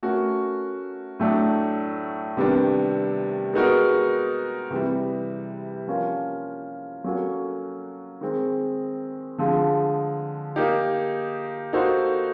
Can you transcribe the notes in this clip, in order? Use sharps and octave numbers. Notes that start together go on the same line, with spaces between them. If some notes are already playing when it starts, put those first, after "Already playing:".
A3 C#4 F#4 A#4
A2 F#3 A3 D4
C3 D#3 G3 B3 D4
G#3 B3 D#4 F#4 A#4
C3 E3 G3
F3 A#3 C#4 F4 A#4
F#3 A#3 C#4 F#4 A4
D#3 G#3 C4
D3 F3 G#3
A#3 D#4 G4
A#3 D#4 F#4 A4 C5